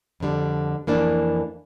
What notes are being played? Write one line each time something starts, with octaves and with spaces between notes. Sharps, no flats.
F2 D3 G3
F2 E3 A#3 D4